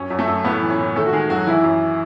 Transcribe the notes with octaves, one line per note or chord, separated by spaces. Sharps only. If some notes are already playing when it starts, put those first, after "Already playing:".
Already playing: F#2 C#4 C#5
F#2
A3 A4
F#2
A2 B3 B4
E3
C#4 C#5
A2
D#3 A3 A4
F#4
D#3 G#3 G#4
F#2 F#3 F#4
E3 E4
F#2